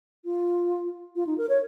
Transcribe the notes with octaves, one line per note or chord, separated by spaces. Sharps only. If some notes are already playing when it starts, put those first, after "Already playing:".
F4
F4
D#4
A#4
C#5